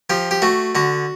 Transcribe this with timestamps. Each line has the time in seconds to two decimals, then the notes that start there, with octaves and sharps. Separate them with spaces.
0.10 F3 G4
0.31 G4
0.42 A3 F#4
0.75 D3 F#4